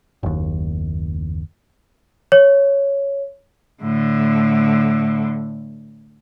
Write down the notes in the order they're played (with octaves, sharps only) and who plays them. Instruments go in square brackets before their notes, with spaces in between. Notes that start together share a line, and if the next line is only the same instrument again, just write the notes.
[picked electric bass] F#1 D#2
[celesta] C#5
[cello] A2 D3